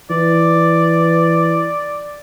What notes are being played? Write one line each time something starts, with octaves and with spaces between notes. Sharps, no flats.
E3 D5